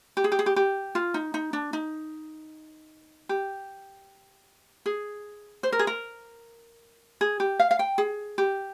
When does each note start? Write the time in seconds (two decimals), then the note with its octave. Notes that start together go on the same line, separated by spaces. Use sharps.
0.17 G4
0.24 G#4
0.32 G4
0.39 G#4
0.46 G4
0.56 G4
0.95 F4
1.14 D#4
1.34 D#4
1.53 D4
1.73 D#4
3.29 G4
4.86 G#4
5.63 C5
5.72 A#4
5.79 G#4
5.87 A#4
7.21 G#4
7.40 G4
7.59 F5
7.71 F5
7.79 G5
7.98 G#4
8.38 G4